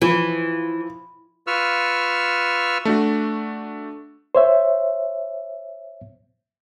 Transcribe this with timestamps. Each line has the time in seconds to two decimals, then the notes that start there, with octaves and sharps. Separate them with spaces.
0.02 E3 F3
1.47 F4 B4 C#6 E6 F6
2.85 A3 D4 F#4
4.35 C5 C#5 E5